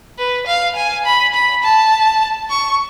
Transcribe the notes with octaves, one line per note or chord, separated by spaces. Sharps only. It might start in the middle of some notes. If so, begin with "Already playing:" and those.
B4
F5
G#5
B5
B5
A5
C#6